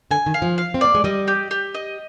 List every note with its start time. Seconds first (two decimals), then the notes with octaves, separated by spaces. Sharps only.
0.11 D3 G#5
0.26 D#3
0.34 F5
0.42 F3
0.58 F5
0.74 C4
0.81 A#3 D5
0.95 G#3
1.04 G3 D#5
1.28 G4
1.51 G4
1.74 D#5